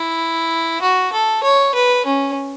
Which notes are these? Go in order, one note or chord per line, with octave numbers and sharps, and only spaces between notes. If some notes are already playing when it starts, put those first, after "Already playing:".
Already playing: E4
F#4
A4
C#5
B4
C#4